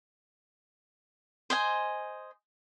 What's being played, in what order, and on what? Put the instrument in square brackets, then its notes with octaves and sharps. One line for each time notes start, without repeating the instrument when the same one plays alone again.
[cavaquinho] C5 D#5 G#5